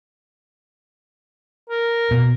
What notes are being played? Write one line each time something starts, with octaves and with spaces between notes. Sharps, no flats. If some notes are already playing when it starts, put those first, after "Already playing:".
A#4
B2